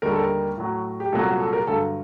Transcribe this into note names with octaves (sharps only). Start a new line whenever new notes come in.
D#2 D3 G3 A#4
A4
A#4
A2 F#3
G4
C2 A#2 F#3 A4
F#4
A4
A#4
G2 D3 F#3 A4